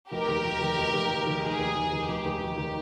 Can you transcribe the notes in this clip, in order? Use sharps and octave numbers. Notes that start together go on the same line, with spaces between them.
F1 G4 A#4
D#2
F1
D#3
F1
D#2
F1
D#3
F1 G#4
D#2
F1
D#3
F1 G4
D#2
F1
D#3